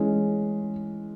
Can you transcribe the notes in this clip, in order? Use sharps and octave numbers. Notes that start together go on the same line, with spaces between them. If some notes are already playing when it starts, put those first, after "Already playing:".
Already playing: E3 G#3 C#4